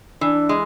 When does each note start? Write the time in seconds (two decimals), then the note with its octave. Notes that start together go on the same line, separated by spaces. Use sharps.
0.21 E3 D4
0.49 G#3